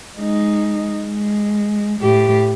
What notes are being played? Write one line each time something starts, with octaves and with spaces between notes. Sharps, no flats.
G#3 D#4
G#3
A2 G4